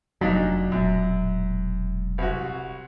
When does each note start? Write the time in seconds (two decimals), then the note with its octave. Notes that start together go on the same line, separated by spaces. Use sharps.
0.21 F1 A#2 F#3 D4 D#4
0.72 E1 F#2 A#2 G#3
2.18 C2 F#4